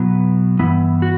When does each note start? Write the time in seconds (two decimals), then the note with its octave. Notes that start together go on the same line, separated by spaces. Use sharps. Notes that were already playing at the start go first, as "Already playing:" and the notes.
Already playing: B2 F#3 B3 E4
0.59 G2 E3 B3 E4
1.02 F#4